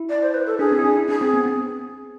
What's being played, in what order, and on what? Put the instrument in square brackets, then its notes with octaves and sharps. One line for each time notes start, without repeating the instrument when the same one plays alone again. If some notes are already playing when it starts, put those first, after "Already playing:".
Already playing: [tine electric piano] E4
[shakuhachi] D5
C5
B4
A4
[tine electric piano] D4 [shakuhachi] G#4
[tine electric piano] C4
E4
D4
E4
[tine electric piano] D4 [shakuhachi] G#4
[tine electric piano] C4
B3
C4